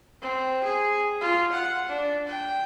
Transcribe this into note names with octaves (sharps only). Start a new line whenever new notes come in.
C4
G#4
F4
F#5
D4
G5